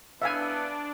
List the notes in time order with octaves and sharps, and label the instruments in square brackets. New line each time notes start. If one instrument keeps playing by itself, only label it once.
[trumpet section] B3 E4 B4 [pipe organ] D4 [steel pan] E5 F5 G#5